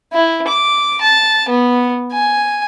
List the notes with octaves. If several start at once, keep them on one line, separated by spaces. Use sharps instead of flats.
E4
D6
A5
B3
G#5